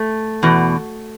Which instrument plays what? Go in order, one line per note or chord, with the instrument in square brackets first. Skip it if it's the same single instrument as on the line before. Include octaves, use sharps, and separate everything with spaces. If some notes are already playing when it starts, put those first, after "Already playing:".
Already playing: [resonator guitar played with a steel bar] A3
E2 B2